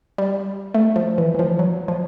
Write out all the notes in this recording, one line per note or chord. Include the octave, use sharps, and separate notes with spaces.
G3
A3
F3
E3
E3
F3
F#3
F3